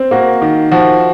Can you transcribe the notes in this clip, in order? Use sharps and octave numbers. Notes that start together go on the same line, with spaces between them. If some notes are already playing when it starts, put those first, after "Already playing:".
Already playing: C4
A#3 F#4
D#3
F3 F#4